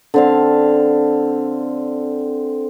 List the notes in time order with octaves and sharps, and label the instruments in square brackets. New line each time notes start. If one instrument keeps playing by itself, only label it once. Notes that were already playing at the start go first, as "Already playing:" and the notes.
[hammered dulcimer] D3 C4 F5